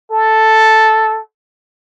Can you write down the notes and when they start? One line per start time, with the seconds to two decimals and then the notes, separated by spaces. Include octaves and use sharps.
0.12 A4